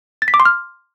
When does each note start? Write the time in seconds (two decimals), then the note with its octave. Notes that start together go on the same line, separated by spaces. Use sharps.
0.22 A6
0.28 B6
0.34 D6
0.40 C6
0.45 F6